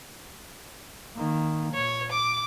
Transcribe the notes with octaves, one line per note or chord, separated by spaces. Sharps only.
D#3 A#3
A#2 C#5
D6